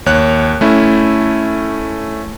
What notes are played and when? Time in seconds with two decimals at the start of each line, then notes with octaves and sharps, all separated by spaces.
0.06 D#2 C#5 F#6
0.61 A3 C#4 E4